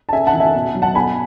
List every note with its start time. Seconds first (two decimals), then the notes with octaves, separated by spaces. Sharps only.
0.09 A5
0.12 C#3 E5 G#5
0.27 F#5 A5
0.34 E3
0.40 E5 G#5
0.54 B2
0.75 F#3
0.82 F#5 A5
0.95 B2 G#5 B5